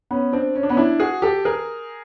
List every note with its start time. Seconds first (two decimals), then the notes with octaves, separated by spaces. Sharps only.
0.11 B3 C#4
0.32 C4 D4
0.55 C#4
0.63 D4
0.69 B3 C#4
0.77 D4 E4
1.00 F#4 G#4
1.22 G4 A4
1.45 G#4 A#4